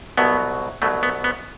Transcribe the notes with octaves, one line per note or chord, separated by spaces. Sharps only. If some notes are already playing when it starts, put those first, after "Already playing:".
C2 B2 F#3 B3
C2 B2 F#3 A3
B3
B3